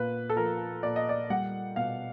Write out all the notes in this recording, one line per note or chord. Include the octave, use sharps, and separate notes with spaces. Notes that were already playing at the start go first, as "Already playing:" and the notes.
Already playing: A#2 B4
A4
F3 A#4
A#2 D5
D#5
D5
G3 F#5
B2 F5